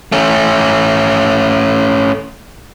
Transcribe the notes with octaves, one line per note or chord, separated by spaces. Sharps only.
A3 C#4